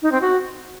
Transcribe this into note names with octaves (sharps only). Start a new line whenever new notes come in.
D#4
C4
F#4